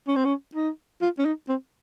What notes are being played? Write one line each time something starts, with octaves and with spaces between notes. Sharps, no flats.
C#4
C4
C#4
D#4
F4
C#4
D#4
C4